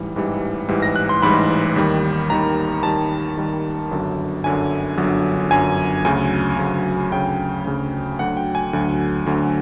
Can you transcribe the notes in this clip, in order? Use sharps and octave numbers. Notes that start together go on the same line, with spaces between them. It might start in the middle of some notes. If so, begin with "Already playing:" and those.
Already playing: A1 G#2 E3 G3
A1 G#2 E3 G3
A1 G#2 E3 G3
A#6
F#6
C6
A1 G#2 E3 G3 B5
D#2 D#3 G3
D#2 D#3 G3 A#5
D#2 D#3 G3 A5
D#2 D#3 G3
G1 F#2 D3 F#3
G1 F#2 D3 F#3 G#5
G1 F#2 D3 F#3
G1 F#2 D3 F#3 G#5
D2 C#3 F#3 G#5
D2 C#3 F#3
D2 C#3 F#3 G5
D2 C#3 F#3
D2 D3 F#3 F#5
G5
G#5
D2 D3 F#3
D2 D3 F#3